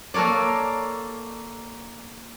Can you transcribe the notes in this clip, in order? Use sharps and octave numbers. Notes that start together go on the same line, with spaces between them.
A#3 A4 A#4 C#5 D5